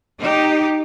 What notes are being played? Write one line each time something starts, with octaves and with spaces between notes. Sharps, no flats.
D#4 G4